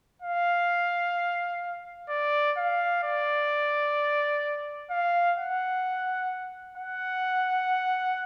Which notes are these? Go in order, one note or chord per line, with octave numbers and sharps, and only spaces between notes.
F5
D5
F5
D5
F5
F#5
F#5